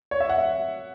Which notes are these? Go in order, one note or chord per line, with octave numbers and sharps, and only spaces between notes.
C#5
E5
F#5
E5